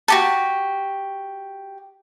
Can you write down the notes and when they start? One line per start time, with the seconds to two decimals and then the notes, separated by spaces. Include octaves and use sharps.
0.08 F#4 G4 A4